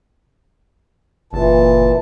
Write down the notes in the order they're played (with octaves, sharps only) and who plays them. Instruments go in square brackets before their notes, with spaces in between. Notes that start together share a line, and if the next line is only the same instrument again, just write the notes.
[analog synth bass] F#1 [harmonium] A#2 E3 A5